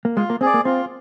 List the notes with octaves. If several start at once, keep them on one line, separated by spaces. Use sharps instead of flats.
A#3
G#3 F4
A#3
C4 G#4 D5
A#3
C4 F4